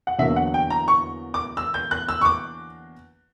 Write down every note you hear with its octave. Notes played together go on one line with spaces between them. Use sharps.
F#5
E2 D3 F#3 A#3 E5
F#5
G5
A#5
C#6
D6
E6
G6
F#6
E6
C#6
D6